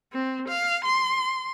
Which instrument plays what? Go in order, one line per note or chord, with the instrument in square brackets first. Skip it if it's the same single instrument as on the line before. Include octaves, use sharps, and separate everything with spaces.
[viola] C4
F5
C6